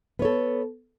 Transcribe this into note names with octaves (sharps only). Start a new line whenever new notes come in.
B3 A4 C#5